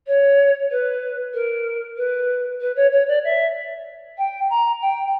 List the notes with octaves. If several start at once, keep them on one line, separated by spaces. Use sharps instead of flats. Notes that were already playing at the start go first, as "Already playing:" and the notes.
C#5
B4
A#4
B4
B4
C#5
C#5
D5
E5
G5
A#5
G5